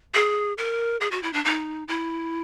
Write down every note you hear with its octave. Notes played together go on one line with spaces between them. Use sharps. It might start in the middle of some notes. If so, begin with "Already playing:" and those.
G#4
A#4
G#4
F#4
E4
D4
D#4
E4